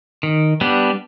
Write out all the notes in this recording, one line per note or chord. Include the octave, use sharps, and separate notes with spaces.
D#3
G3 B3 D4